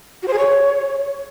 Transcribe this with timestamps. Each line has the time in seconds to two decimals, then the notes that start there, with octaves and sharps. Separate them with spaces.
0.22 F#4
0.28 C5
0.33 G#4
0.38 C#5